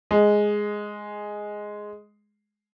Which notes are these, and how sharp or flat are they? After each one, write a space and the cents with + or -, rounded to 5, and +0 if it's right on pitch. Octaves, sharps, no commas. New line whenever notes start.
G#3 +0